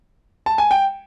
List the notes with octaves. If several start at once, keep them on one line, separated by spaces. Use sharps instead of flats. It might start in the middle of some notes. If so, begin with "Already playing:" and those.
A5
G#5
G5